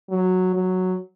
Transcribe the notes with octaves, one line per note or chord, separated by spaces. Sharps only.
F#3
F#3